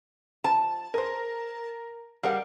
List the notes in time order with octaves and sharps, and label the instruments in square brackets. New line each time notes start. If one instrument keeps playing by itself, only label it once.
[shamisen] F3 [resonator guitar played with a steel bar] A5
[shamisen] G#4 C5 [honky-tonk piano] A#4
[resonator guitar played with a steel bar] G3 [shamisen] G#4 A#4 F#5 [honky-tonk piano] F5